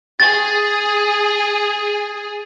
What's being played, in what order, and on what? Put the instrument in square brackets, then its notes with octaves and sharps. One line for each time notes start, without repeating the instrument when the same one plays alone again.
[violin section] G#4 [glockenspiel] A6